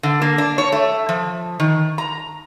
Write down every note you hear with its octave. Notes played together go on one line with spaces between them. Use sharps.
D3
A#3
D4
C#5
A3
F3
D#3
A#5